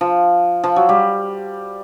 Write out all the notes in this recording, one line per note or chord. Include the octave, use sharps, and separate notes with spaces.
F3
F3
F#3
G3